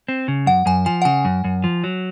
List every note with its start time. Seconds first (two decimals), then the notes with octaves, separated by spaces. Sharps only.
0.08 C4
0.28 C#3
0.46 F#2 F#5
0.66 F#2 G#5
0.86 F3 G#5
1.02 F#5
1.05 C#3 G#5
1.25 F#2
1.44 F#2
1.64 F3
1.84 F#3